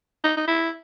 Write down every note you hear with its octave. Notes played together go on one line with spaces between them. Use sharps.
D#4
D#4
E4